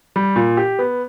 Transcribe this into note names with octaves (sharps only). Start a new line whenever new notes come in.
G3
A#2
G4
B3